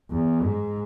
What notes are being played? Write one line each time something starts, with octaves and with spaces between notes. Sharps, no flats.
E2
G#2